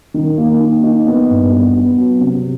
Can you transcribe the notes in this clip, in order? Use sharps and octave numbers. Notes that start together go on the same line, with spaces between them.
D#3
A#3
D#4
D#4
B3
G2
B3
B3
F#3
C3